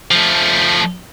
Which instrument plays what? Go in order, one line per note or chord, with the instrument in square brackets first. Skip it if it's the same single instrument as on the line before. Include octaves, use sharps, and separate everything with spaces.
[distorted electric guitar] F3 A3